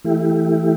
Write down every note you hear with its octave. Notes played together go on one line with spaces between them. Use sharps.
E3 A3 E4 G4